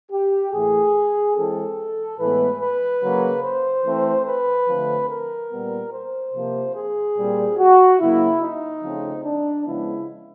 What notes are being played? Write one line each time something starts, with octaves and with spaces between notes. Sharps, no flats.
G4
A2 E3 A3 G#4
E3 G#3 C4 A4
A2 E3 G#3 B3 B4
B4
C#3 F#3 A#3
C5
E3 A3 C4
B4
D3 F3 A3 C4
A#4
A#2 G3 B3
C5
C3 F3 A#3
G#4
A#2 G3 C4
F#4
C#3 F#3 A#3 E4
D#4
C#3 F3 A3 C4
D4
C#3 F3 G#3 B3 E4